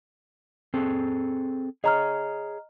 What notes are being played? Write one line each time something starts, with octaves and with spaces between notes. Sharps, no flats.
C4 G#4 A4
G#4 C#5 D#5 A#5 F6